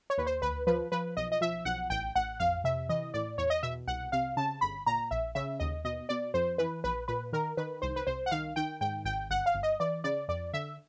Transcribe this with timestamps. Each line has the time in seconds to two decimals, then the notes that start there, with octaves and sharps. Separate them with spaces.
0.10 C#5
0.18 D#2 B4
0.26 C5
0.42 D2 B4
0.67 F3 B4
0.92 F3 B4
1.17 B1 D#5
1.32 D#5
1.41 F3 E5
1.65 B1 F#5
1.90 A1 G5
2.15 A1 F#5
2.40 F2 F5
2.64 C3 E5
2.89 E3 D#5
3.14 A2 D5
3.38 E2 C#5
3.50 D#5
3.63 B2 E5
3.87 C2 F#5
4.12 C3 F5
4.37 C#3 A5
4.61 G1 B5
4.86 A#2 A#5
5.11 A#1 E5
5.35 C#3 E5
5.60 D#2 D#5
5.85 B2 D#5
6.09 B2 D5
6.34 F2 C5
6.58 E3 B4
6.84 A#1 B4
7.08 A#2 B4
7.33 D#3 A#4
7.57 D#3 B4
7.82 C2 C5
7.96 B4
8.07 C2 C5
8.26 F#5
8.31 D#3 F5
8.56 D#3 G5
8.81 G#2 G5
9.05 G#1 G5
9.30 G1 F#5
9.46 F5
9.55 G1
9.63 D#5
9.80 E3 D5
10.04 C#3 D5
10.28 F2 D5
10.53 D3 E5